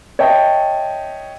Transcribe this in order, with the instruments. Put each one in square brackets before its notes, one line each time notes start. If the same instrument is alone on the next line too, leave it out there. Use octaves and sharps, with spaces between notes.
[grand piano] C#5 D#5 E5 G5 A5